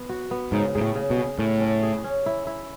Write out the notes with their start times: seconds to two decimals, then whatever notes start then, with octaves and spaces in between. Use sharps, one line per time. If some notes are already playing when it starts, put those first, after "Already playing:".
Already playing: B3
0.09 F#4
0.31 B3
0.52 G#2 C#3
0.75 G#2 G#4
0.81 A2
0.95 C#3
1.10 B2
1.17 G#4
1.39 A2 C#4
1.61 C#4
1.83 G#4
2.04 C#4
2.26 E4
2.47 E4